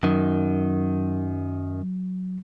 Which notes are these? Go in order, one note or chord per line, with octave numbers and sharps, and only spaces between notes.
F#2 D#3 F#3